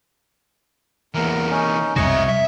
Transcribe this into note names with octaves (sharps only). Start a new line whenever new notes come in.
E2 E3 A#3 A#4
C#4 D#4
C2 F2 B2 F#4 C#5 D#5 E5 C#6
E5